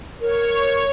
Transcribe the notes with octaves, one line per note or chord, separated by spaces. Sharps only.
A#4 C#5